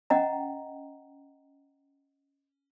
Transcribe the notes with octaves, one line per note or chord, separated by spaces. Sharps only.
C#4 D#5 F#5 G5 A#5